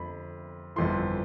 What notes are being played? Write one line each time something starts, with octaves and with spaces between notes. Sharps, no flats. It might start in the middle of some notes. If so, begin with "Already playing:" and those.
Already playing: F2 D3 B5
G1 F2 E3 C6